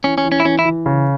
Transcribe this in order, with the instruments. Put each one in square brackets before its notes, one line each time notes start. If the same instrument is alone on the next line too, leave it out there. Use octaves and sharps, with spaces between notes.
[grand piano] E3 [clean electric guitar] C#4
[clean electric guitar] C#4
[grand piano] E3
[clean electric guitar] C#4
E4
[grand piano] E3 [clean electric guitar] C#4
[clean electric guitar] E4
[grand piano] E3
C#3